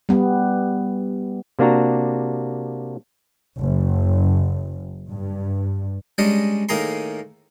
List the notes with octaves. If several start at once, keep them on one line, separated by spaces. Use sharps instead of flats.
G3 B3
C3 A#3 D4 F#4 A#5
F#1
G2
G3 G#3 C#4 D4 D#5
A2 D#3 A#3 G#4 A#5 C6